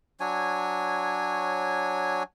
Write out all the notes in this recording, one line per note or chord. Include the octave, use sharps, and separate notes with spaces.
F#3 D4 C#5 G#5